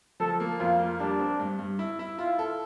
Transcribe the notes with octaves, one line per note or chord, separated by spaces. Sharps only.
F3 A4
A#3
F2 F4
A#3
G3 D4
C4
G2
G2
E4
E4
E4 F4
A4